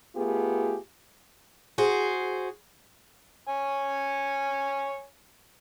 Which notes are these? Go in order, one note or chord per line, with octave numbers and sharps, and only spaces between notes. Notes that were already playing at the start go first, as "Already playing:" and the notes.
A3 B3 F4 G4 G#4
F#4 G#4 C5
C#5 G#5